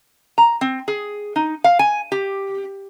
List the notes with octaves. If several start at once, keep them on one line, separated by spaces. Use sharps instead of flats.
A#5
C4
G#4
D#4
F5
G#5
G4